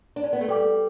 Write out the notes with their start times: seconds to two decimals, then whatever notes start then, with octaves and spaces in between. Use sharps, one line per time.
0.16 D4
0.23 C#4
0.33 B3
0.41 A3
0.49 G3 A4 D5 G5 D6